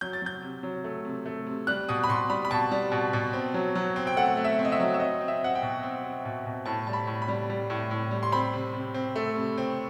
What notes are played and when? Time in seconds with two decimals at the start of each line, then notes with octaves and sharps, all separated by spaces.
0.01 F#3 G6
0.13 A6
0.22 F#3 G6
0.42 C3
0.63 F#3
0.84 A3
1.05 C3
1.26 A3
1.47 C3
1.67 G3 F#6
1.89 B2 D#6
2.04 B5
2.09 B2 C6
2.30 G3 B5
2.45 B5
2.51 B2 A5
2.71 G3
2.92 B2
3.13 B2
3.33 C4
3.54 F#3
3.75 F#3
3.96 C4
4.07 G5
4.17 A3 F#5
4.37 A3
4.44 E5
4.59 C4
4.65 D#5
4.72 E5
4.80 F#3
4.94 E5
5.00 C4 D#5
5.21 C4
5.28 E5
5.41 C4 F#5
5.55 G5
5.62 B2
5.83 C4
6.04 C4
6.25 B2
6.46 B2
6.66 A2 A5
6.87 G3 A5
6.93 B5
7.07 A2
7.22 B5
7.28 G3
7.50 G3
7.70 A2
7.91 A2
8.11 G3
8.23 C6
8.32 C4 B5
8.53 C3
8.74 C3
8.94 C4
9.16 A3
9.36 C3
9.58 C4